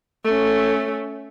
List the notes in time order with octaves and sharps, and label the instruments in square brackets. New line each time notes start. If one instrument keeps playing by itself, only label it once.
[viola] A3 C#4